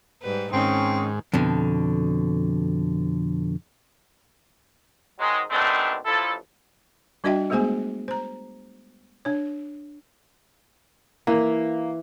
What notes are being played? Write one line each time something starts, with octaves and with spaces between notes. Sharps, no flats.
G#2 G3 B4
G#2 D#3 C4 C#4 D#4
F2 B2 D3
G#2 D#3 F#3 G#3
B2 D#3 G#3 A3 C4 D4
A1 F3 E4 A4
G3 D4 F#4 D#5 E5 G5
G#3 A3 B3 G#4 C5 G#5
C5 A#5
D4 C#5
E3 A#3